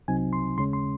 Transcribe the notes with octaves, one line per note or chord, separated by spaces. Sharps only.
C2 C3 F#3 C4 D#4 G#5
C6
D#2 C#3 G#3 C#4 C6
C6